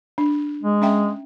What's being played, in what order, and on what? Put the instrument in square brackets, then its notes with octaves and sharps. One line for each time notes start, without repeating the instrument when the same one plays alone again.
[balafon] D4
[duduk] G#3
[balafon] C#4 E5 G5